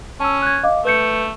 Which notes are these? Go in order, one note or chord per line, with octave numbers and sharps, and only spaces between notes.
C#4 A5 E6
F#6 G#6
D#5 F5 D6
A3 B4 G6 C#7